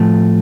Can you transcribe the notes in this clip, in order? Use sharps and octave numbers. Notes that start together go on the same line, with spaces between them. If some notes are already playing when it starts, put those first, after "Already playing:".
Already playing: A2 F3 A3